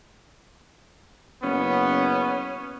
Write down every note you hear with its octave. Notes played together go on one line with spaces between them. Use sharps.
F#1 B3 C#4